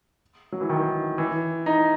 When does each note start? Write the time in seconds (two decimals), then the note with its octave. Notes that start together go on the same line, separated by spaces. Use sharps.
0.52 F#3
0.61 E3
0.69 D#3
1.18 E3
1.66 D#4